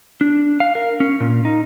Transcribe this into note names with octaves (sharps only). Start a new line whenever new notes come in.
D4
F5
A#4
C#4
A#2
D#4